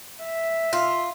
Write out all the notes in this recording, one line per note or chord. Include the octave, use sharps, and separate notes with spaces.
E5
F4